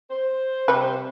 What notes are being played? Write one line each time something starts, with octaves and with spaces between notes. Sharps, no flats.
C5
C3 G3 B4